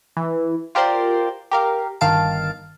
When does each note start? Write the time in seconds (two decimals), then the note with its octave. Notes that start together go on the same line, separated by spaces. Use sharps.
0.17 E3
0.75 F4 G4 A#4 C5 D5 C6
1.51 G4 A#4 F5
2.01 G1 D#3 F5 A5 D7